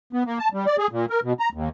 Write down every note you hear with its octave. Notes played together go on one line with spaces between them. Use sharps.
B3
A#3
A5
G3
D5
G#4
A#2
A#4
B2
A#5
D#2